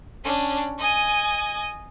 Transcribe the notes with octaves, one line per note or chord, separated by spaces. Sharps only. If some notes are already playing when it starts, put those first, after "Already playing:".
C#4 D4
D#5 G#5